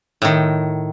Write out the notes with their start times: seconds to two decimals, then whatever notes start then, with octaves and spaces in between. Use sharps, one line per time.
0.22 A2 D#3